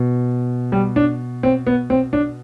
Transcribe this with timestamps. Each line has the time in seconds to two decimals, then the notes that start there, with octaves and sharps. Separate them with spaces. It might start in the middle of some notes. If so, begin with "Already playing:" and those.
Already playing: B2
0.72 G3
0.96 D4
1.43 C4
1.67 B3
1.90 C4
2.13 D4